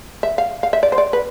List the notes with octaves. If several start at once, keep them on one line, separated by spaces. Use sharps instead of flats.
E5
F5
F5
E5
D5
C5
D5
B4